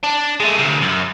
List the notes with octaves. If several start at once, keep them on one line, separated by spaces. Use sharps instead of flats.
D4
G#3 A3
D2 C3
F#2